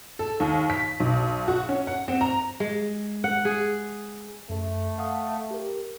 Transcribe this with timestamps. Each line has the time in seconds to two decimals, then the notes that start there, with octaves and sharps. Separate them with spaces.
0.19 A4
0.40 D#2
0.70 B6
1.00 B1
1.48 F#4
1.69 C#4
1.87 F#5
2.08 C4
2.21 A#5
2.60 G#3
3.24 F#5
3.45 G#4
4.50 F#2 A3 A4
4.98 F5 F#5 D#6
5.51 G4 A#4